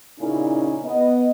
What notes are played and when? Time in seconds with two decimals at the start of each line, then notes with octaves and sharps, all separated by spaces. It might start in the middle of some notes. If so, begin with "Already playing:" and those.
0.20 A#2 C#3 C#4 D#4 E4
0.84 B3 D#5